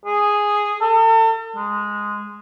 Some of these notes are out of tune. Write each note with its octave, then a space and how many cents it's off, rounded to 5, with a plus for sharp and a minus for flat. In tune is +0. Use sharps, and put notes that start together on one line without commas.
G#4 -5
A4 +40
G#3 -5